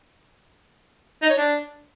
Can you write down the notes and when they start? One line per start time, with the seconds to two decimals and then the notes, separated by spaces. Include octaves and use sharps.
1.22 D#4
1.30 C#5
1.37 D4